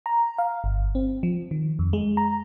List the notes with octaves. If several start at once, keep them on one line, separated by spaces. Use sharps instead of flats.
A#5
F5
G1
C4
F3
D#3
F2
G#3
A#5